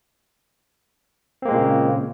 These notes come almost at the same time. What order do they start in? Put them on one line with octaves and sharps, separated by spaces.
C4 A#3 G#3 A#2 C#3